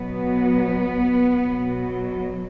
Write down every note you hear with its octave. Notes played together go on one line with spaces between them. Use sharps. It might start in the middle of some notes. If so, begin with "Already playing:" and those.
Already playing: B2 F#3 B3
B2 F#3